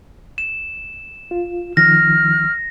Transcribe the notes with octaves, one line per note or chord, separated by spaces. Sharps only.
E7
F4
D#3 F3 F6 A#6